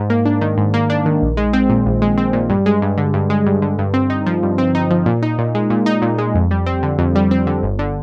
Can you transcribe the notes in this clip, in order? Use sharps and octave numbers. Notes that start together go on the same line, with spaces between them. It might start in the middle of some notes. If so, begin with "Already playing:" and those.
Already playing: G#2
A#3
D4
D#3
G#2
A#3
D4
D#3
A#1
G#3
C4
A#2
A#1
G#3
C4
A#2
G2
G#3
G2
D3
G2
G#3
G2
D3
G2
C4
D#4
F3
G2
C4
D#4
F3
A#2
D#4
A#2
G#3
A#2
D#4
A#2
G#3
F2
G3
C4
D3
F2
G3
C4
D3
G1
D3